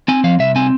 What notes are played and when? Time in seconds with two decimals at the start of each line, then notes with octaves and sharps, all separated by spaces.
0.08 C4 G#5
0.24 F3 F5
0.39 C2 E5
0.56 C4 G#5